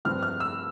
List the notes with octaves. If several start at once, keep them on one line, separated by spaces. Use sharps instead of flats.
G2 F3 C4 F6
F6
E6